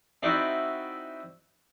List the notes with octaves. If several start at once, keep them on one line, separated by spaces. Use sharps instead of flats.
C4 D#4 E4 F#4 D5 G5